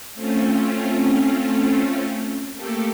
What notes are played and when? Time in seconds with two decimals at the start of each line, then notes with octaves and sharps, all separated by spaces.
0.14 A3 C4 C#4 F4
2.54 A3 A#3 G4 A4